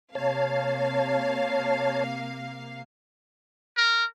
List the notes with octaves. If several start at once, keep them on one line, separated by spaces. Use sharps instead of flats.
C3 A#3 C#5 F5 A5
A#4